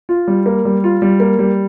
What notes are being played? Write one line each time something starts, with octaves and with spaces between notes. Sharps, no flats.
F4
G3
A#3
G3
F4
G3
A#3
G3